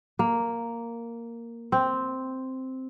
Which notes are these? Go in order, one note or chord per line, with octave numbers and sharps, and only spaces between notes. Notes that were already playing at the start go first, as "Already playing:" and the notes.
A#3
C4